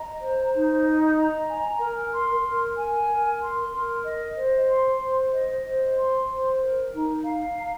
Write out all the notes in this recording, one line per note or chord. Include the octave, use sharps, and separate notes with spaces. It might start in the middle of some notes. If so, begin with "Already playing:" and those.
Already playing: D#5 A#5
C5
D#4
D#5
A#5
G#5
A#4
C6
A#4
G#5
A#4
C6
A#4
D#5
C5
C6
C5
D#5
C5
C6
C5
A#4
D#4
F5
A#5